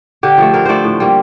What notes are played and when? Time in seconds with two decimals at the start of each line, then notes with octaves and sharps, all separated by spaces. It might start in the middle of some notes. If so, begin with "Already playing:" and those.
0.23 D3 G4
0.38 F3 A3
0.54 D3 A#4
0.65 F3 A3 C5 D5
0.84 A2
1.00 G3 A#3